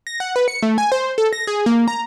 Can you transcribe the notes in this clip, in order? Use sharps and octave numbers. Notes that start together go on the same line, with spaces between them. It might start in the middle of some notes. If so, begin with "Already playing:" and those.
A#6
F#5
B4
C#7
A3
G#5
C5
A4
A#6
G#4
A#3
A#5